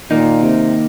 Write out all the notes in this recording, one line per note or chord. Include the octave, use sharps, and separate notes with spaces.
A#2 D#3 A#3 D#4
C3